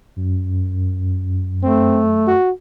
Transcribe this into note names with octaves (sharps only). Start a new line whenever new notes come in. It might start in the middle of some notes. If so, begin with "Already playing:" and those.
F#2
A3 C4
F#4